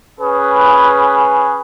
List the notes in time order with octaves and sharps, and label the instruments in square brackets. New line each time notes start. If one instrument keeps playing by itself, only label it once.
[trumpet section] C#4 G#4 B4